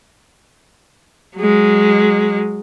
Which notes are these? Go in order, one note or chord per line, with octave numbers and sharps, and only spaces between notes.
F#3 G#3